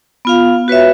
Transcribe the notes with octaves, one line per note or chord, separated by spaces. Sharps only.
B3 F4 F5
F#4 B4 C#5 E5